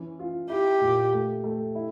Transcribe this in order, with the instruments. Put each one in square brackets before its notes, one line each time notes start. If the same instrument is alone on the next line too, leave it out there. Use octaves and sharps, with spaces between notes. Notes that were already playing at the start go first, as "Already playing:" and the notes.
Already playing: [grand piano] E3 C#4
F4
[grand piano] E4 [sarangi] G4
[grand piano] A#2
A3
A3
E4